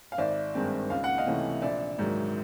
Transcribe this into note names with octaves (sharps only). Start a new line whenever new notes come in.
F5
G#1 D5 E5
G2 D#3 G#3 C4
C#2 F5
F#5
D#5 F5
C3 E3 A3 C#4
A#1 D5 E5
G#2 D#3 F#3